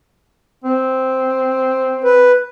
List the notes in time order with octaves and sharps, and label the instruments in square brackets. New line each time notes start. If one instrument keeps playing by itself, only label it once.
[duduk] C4
[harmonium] B4